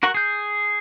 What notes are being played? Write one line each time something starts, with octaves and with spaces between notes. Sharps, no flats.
F#4 A#4 F#5 C#6
G#4 G6